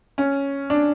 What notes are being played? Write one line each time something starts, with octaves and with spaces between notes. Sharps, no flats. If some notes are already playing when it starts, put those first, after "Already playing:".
C#4
D4